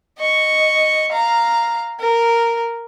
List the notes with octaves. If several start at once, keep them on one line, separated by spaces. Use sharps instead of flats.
D#5 C#6
F5 A#5
A#4